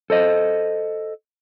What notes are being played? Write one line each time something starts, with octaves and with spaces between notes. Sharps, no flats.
A4 C5 D#5